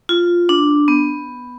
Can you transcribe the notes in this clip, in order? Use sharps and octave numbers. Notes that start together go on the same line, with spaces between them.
F4
D4
B3